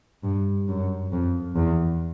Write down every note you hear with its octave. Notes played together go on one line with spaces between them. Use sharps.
G2
F#2
F2
E2